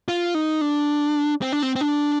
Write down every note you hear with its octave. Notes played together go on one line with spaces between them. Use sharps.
F4
D#4
D4
C4
D4
C4
C4
D4